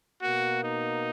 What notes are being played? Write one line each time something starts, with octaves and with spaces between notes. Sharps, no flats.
B2 A#3 F#4
D#4